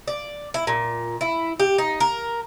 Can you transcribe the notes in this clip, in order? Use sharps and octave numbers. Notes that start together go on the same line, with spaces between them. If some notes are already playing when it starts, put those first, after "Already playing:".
D5
E4
A#2
E4
G4
D#4
A#4